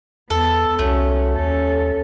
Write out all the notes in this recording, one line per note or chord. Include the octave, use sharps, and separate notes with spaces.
E2 B3 A4
C2 A3 C#4 F#4
D#2 C#4 A4